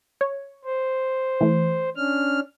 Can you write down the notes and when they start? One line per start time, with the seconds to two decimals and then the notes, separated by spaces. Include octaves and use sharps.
0.21 C#5
0.64 C5
1.41 E3 A3
1.96 C#4 D4 F6